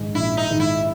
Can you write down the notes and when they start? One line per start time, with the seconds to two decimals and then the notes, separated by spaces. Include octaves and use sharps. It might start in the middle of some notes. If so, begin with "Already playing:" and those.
Already playing: A#1 G#2 D#3 G#3
0.14 A#1 E4
0.37 D#4
0.49 G#2 D#3 G#3
0.60 E4